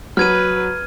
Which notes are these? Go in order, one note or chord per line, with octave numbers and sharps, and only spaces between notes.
F#3 B4 F6 G#6 D#7